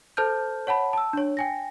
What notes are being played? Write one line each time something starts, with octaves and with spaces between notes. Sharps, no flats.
A4 C5 A5 F6 G6
C#5 F#5 A5 B5
A5 E6
D4 C#5
G5 G#5 A#6